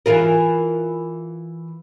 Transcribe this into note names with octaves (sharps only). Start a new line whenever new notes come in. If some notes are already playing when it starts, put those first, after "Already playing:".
E3 F4 A#4